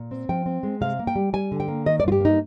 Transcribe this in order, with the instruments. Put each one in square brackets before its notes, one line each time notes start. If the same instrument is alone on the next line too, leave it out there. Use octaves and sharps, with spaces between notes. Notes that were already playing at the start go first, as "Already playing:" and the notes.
Already playing: [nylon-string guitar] A#2
C4
F3 G5
C4
G#3
C3 F5
A#3
G5
G3
G3 G#5
D3
G5
A#3
D#3 D#5
D5
G2 F4
G4
A#3 D#4